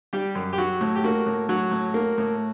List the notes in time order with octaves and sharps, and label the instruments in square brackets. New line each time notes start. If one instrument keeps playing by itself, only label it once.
[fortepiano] G3 G4
F#2
G4
F#3 F#4
A2
G4
A#3 F#4
A2
F#3 F#4
A2
A#3
A2